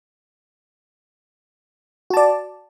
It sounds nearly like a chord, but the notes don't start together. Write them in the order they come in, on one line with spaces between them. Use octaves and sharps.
F#4 A5 D5